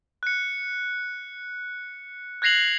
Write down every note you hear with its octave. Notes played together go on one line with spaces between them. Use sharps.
F#6 C#7
F#6 G#6 A#6 C7 F7 F#7